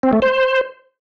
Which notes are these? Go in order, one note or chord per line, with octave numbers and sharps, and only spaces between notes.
C4
A3
C5